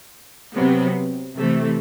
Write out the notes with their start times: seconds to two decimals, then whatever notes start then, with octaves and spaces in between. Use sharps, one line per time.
0.54 C3 F#3 B3
1.36 C3 E3 A3